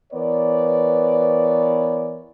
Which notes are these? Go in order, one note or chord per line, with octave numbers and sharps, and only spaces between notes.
E3 B3 A#4 C#5 D5